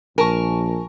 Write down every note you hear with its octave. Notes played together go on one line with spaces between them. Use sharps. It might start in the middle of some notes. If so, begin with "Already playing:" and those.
A#1 A#4 G#5 A5 C#6